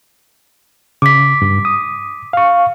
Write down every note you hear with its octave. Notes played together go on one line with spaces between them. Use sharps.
C#3 D6 B6
G2
D#6
F5 C#6